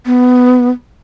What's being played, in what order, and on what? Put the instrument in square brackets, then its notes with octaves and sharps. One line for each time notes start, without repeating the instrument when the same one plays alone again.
[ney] B3